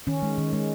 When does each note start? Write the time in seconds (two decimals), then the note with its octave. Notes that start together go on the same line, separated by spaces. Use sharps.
0.07 D#3 C#4
0.22 G#3
0.38 D#3
0.53 G#3